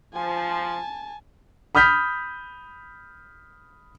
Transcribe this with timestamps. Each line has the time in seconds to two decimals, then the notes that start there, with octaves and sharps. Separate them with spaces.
0.14 F3 G#5 A5
1.75 B5 D#6 F6 G6 B6